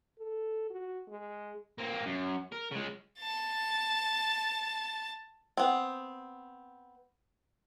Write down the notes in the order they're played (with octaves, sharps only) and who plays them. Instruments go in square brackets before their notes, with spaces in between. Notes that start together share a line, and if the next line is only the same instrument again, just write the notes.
[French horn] A4
F#4
G#3
[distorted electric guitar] A#3 C4
F#2
A#4
C#3 G#3
[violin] A5 A6
[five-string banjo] B3 C4